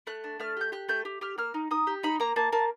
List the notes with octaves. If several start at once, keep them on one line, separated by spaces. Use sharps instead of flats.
A3 F#6
D4
A3 F6
G4 G6
G4 F#6
A3 G6
G4
G4 F6
A#3 F6
D#4
D#4 D#6
G4
D#4 B5
A#3 A#5
A#3 A5
A#3 A5